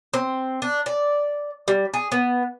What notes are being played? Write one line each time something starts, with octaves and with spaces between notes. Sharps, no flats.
C4
D4
D5
G3
G#4
B3